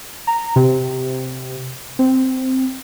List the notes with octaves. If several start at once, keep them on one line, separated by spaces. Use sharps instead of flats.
A#5
C3
C4